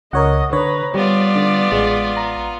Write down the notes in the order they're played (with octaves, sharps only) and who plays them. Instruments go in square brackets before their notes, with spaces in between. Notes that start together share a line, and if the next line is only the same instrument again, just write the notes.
[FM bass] C#2 [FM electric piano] A#4 C#5 F#5 [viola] D#5
[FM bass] D3 [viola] B4 A#5 [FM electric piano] C#5
[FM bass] G3 [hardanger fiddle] B3 F4 [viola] D5
[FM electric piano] D3
[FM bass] A1 [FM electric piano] G#3
[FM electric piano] A#5